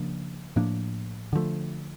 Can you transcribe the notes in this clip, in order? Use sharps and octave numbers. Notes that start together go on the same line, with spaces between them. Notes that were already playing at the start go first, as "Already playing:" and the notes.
Already playing: C#3 F3 A#3 D4
A2 F3 A#3 D4
D3 F3 A3